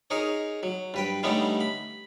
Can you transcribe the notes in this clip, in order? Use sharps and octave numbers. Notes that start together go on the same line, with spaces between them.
D#4 G#4 A#4 C#5
F#3
G2 B4 G5
D3 G3 A3 B3 C#4 D#4
B5